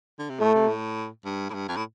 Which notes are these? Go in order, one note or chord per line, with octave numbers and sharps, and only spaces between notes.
D3
C3
A2 A3
C3
A2
G2
A2
G2
F2
A2